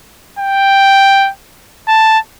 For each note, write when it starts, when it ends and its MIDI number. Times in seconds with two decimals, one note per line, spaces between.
0.39 1.30 79
1.88 2.18 81